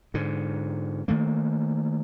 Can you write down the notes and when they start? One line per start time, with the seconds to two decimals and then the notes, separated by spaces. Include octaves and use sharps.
0.14 G#2 D3
1.08 D#3 E3 A3 A#3